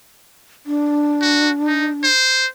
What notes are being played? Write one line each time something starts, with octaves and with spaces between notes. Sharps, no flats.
D4
F#4
D#4
C5